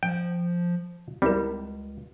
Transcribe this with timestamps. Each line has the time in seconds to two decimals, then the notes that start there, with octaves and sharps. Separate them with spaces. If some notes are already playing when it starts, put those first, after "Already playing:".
0.03 F3 G5
1.22 C#2 G3 C4 E4 A#4